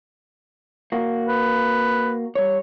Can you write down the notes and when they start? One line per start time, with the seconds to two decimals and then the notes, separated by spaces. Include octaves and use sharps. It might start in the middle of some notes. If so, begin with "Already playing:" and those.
0.92 A#3 F#4
1.29 B4
2.35 G3 C#5